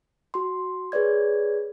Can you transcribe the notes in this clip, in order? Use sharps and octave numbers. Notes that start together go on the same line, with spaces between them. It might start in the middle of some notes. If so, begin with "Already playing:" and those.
F#4 C6
G#4 B4 C#5 D5 G#6